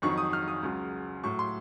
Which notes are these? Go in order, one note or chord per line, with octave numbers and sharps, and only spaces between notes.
F2 D#3 F#3 C#6
D#6
F6
D#6
C#2 C#3 F#3
A2 F#3 C#6
C6